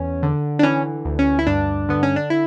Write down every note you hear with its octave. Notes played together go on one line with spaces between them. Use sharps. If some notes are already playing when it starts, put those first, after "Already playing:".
Already playing: E2 C#4
D3
D4
E3 C#4
D2
C#4
E4
G2 D4
D3 B3
C#4
D4
E4